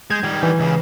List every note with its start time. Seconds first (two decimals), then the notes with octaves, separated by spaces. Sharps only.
0.10 G#3 G6 G#6
0.23 D#3 G3
0.43 E3
0.60 C#2 C#3